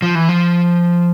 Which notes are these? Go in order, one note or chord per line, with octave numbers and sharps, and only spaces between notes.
F3
E3
F3